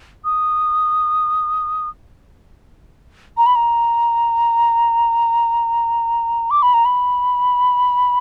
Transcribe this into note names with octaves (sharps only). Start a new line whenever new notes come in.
D#6
A#5
B5
A#5
D6
B5
A#5
B5